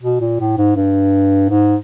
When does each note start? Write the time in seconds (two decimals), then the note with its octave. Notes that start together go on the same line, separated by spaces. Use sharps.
0.02 B2
0.21 A#2
0.40 A2
0.58 G#2
0.76 G2
1.50 G#2